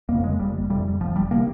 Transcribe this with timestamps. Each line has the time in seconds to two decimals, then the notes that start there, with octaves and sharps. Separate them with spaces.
0.09 F2 C#3 A#3
0.24 G#3
0.39 F1 G3
0.70 F2 C3 G3
1.00 F1 F3
1.16 G3
1.31 C3 A#3